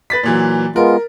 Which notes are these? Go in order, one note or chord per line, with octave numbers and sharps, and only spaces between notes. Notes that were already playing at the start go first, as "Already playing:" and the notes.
B4 A6 B6
A#2 E3 F#3
G#3 B3 F4 A#4